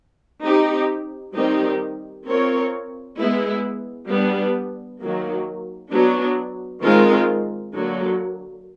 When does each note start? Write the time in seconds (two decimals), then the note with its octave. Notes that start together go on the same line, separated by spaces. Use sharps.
0.45 C4 D#4 G4
1.36 D#3 G3 C4 D#4 G4
2.26 C4 F4 A#4 C#5
3.18 G#3 B3 E4 G#4
4.09 G3 B3 D4
5.00 D#3 F#3 A#3
5.92 F#3 B3 D4
6.82 D#3 G#3 C4 F4 A#4
7.73 D3 F#3 A#3